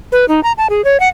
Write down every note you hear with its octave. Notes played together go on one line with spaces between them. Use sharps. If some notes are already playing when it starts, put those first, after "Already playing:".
B4
D#4
A#5
A5
G#4
C#5
F#5